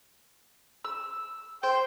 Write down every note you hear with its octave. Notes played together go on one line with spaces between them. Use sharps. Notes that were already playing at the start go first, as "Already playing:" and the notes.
E6
C5 G5